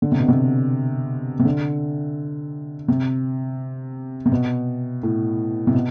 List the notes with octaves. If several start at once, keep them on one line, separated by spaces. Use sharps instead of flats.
D3
C3
B2
C3
C3
D3
C3
C3
B2
A2
C3
B2